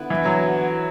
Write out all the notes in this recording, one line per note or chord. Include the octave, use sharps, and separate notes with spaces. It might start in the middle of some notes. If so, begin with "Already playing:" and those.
Already playing: D3 B3 E4 B4
E3
F#3